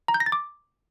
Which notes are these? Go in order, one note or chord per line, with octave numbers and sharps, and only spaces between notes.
A#5
G6
A#6
A6
D6